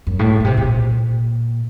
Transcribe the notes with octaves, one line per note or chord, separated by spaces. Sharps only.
F#2
A2
A#2
C3
A#2